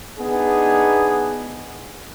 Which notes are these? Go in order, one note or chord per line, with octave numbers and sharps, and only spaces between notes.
B3 D4 D#4 G#4